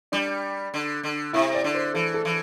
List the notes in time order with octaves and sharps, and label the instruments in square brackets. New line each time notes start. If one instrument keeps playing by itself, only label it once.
[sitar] G3 [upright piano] D4
[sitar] D3
D3
[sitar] C3 [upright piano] E4
[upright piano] D5
[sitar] D3
[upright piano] C5
[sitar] E3 [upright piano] A4
[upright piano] A4
[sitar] E3